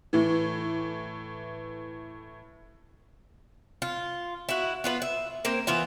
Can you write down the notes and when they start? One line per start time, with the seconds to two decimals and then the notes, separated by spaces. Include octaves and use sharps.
0.13 A2 E3
3.82 F4
4.49 E4 F#4
4.84 B3 F4 B4
5.02 E5
5.45 A#3 C4 A#4
5.67 E3 B3 F4 E5